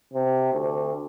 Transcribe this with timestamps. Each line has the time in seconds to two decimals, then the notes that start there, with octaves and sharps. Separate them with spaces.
0.14 C3
0.53 D2